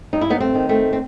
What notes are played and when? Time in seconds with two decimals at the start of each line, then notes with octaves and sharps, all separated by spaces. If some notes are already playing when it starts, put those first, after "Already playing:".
0.13 G2 D#4
0.21 E4
0.30 B3 D#4
0.40 A3 C4
0.55 D#3
0.69 A3 C4
0.93 C4